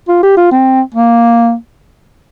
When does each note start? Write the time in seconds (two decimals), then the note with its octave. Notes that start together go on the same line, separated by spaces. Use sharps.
0.08 F4
0.23 G4
0.37 F4
0.51 C4
0.94 A#3